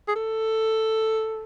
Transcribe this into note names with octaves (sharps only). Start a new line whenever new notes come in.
G#4
A4